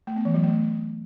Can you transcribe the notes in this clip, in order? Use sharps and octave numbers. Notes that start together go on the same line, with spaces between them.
A3
B3
E3
F#3
A3